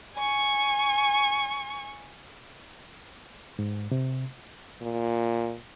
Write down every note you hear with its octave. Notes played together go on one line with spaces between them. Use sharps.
G#5 C#6
G#2
C3
A#2